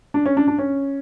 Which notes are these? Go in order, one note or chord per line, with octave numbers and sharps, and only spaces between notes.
D4
C#4
D4
D4
C#4